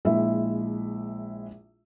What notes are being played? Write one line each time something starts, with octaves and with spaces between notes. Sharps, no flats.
A#1 G#3 E4 E5